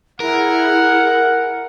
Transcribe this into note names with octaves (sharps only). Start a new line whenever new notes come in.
E4 G#4 A#4 F#5